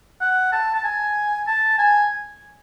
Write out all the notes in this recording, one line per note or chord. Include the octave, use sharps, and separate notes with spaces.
F#5
A5
A5
G#5
A5
G#5